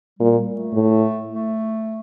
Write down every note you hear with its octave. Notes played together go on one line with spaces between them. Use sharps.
A#2 G3
G3
A3
A2
A3